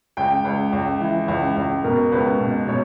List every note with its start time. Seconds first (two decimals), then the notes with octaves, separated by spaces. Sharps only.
0.17 C#2 G5
0.44 C#2
0.73 C#2
1.01 E3
1.28 C#2
1.56 C#2
1.84 B2 A#4
2.12 C#2 B4
2.40 B2
2.68 B2 C#5